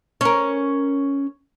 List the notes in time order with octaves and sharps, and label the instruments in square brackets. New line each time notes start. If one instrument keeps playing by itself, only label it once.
[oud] C#4 A#4